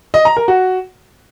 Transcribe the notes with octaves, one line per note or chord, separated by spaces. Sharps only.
D#5
A#5
A#4
F#4